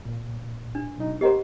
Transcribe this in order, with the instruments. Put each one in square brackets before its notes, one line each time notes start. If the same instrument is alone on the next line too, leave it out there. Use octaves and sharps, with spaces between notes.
[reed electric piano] A#2
[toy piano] D4
[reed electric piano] B2 F#3 D#4
[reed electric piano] B3 A#4 C5 [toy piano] G4 D#5 F#5